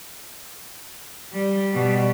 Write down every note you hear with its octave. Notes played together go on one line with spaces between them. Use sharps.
G3
B2 G3